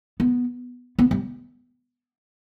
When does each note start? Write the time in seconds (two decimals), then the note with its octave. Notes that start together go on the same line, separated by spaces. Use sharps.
0.20 B3
0.99 B3
1.11 G3